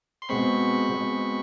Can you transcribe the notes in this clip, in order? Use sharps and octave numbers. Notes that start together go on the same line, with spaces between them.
C6
B2 G#3 C4 B5 C#6
B2 G#3 C4